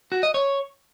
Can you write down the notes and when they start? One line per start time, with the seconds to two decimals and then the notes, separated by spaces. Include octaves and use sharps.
0.12 F#4
0.23 D#5
0.34 C#5